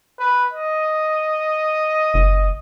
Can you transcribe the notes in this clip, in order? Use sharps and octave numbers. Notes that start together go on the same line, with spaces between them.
B4
D#5
F#1